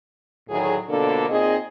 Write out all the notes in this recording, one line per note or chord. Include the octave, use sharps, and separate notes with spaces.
D2 A2 D#3 F#3 G#4
B2 D3 F3 A#3 D4 A4
A#2 C4 D#4 G#4 D#5